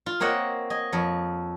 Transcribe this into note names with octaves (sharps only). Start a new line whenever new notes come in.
F4
A#3 C4 C#5 D#5 F#5
D#5 G#5
F2 C#5